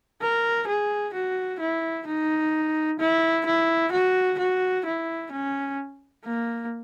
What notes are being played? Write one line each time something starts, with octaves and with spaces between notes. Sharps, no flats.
A#4
G#4
F#4
E4
D#4
E4
E4
F#4
F#4
E4
C#4
A#3